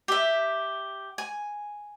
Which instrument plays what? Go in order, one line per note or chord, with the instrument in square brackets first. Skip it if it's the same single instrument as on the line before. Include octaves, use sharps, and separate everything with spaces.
[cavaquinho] G4 E5
G#5